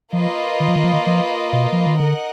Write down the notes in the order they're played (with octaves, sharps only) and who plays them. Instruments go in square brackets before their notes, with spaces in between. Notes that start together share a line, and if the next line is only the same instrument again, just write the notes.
[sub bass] F3 [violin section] A#3 F4 B4 D#5
[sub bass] D#3
F3
D#3
F3
D#3
F3
B2
F3
D#3
[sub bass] D3 [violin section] D#4 A#4 D#5 F#5